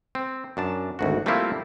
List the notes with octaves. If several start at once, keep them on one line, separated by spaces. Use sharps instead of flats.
C4
F#2 D4 A5
G#1 D2 F#4
G3 A3 A#3 C4 E4 F4